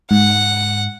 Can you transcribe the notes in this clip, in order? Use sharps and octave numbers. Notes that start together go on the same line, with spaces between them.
G#2 F#5